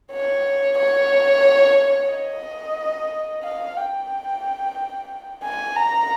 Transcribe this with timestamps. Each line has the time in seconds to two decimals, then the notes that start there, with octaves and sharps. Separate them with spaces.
0.12 C#5
0.79 C#5
2.11 D#5
3.44 F5
3.77 G5
5.44 G#5
5.76 A#5